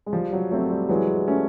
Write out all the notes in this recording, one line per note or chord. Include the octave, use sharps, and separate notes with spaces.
G#3
F3 G3
F#3
F#3 A3 C4
G3
E3 F#3 G#3
A3 C#4